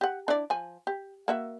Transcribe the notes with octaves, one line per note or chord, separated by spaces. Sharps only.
G4 F#5
D4 E4 D5
F3 G#5
G4
A#3 F#4 E5